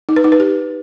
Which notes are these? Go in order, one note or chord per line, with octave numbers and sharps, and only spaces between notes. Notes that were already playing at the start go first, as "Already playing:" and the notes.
D#4
B4
D#4
B4
G4